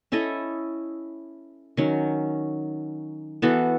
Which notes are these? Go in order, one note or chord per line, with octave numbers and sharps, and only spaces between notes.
C#4 E4 A4 D#5
D#3 F#3 C#4
E3 B3 F#4 A4